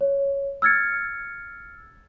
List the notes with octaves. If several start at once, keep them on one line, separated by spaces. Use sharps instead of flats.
C#5
E6 F6 G#6 A6 C#7